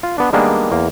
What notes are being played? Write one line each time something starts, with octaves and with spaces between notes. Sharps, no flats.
F4
B3 D4
D#3 G3 G#3 A#3 B3 D4
E2 A#3